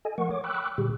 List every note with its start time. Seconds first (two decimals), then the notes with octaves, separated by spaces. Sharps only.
0.05 A4 D#5 G#5
0.18 F3 A3 A#4 F#5 C#6
0.31 C#5 D6
0.44 G5 B5 C#6 D6 E6 F#6
0.78 A#2 D3 G3 G4 G#4